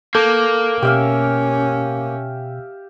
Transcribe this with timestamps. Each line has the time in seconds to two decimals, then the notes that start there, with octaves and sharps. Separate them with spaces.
0.15 A#3 A4 D6 G6
0.82 B2 C#4 G4 E5 F5